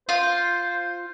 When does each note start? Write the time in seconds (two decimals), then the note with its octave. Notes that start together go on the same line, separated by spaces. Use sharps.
0.09 F4 C5